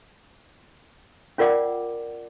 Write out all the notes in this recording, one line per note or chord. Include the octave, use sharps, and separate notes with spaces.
C#4 F4 A#4 D5 F#5 D6